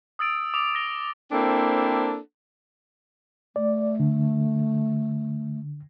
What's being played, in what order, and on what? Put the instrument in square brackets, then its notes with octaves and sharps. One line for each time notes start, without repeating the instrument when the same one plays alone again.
[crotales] D#6 E6 A6 D7
D6 D#6 F7
A#6 G7
[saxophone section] A#3 C4 D4 E4 A4 C5
[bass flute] A3 [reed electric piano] D5
[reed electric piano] D3